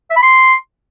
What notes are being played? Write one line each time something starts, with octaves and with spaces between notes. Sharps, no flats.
E5
B5
C6